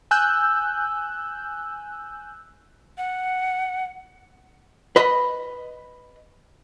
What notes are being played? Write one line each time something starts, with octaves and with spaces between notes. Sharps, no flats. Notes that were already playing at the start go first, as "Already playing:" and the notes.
G#5 E6 F#6 G6
F#5
B4 D#5 B5